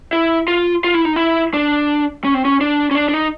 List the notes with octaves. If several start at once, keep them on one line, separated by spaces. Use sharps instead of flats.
E4
F4
F4
E4
D#4
E4
D4
C#4
C4
C#4
D4
C#4
D4
D4
D#4